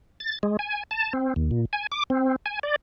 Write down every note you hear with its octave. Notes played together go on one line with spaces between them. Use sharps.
A6
G#3
G#5
A5
C4
D#2
A#2
G#5
D6
C4
G#5
D5